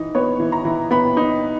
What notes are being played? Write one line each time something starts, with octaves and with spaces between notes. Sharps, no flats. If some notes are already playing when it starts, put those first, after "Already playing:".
Already playing: E3 D#4
B3 C#5
E3
A#5
E3
B3 B5
D#4